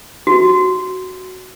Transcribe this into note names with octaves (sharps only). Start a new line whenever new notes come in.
F#4